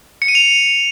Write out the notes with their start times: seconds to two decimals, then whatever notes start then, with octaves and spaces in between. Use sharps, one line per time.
0.22 C#7
0.28 D#7
0.35 F7